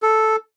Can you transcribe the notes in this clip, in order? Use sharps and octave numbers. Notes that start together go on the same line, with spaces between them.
A4